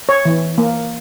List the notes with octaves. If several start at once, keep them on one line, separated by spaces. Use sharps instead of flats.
C#5
E3
A#3